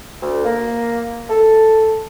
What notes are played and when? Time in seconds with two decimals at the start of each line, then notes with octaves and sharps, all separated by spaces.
0.22 D2
0.45 A#3
1.30 A4